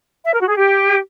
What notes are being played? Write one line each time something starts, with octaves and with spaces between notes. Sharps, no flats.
E5
A#4
F#4
G#4
G4